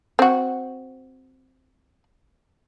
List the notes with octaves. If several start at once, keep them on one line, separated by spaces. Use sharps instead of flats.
C4 F#4